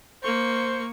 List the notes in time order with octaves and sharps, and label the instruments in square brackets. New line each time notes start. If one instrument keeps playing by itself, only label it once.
[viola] A#3 C#6 [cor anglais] C5